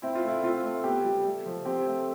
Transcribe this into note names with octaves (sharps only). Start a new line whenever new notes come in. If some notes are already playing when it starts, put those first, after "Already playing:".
C4 E4
F4
A3 E4
C4 F4
A3
B3 G4
G3
A3
F3
C4 G4
A3